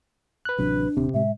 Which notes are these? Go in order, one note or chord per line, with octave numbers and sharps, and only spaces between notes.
B4 F#6
A1 C3 F#3 D4
D#1 C3 C4
A2 G#3 E5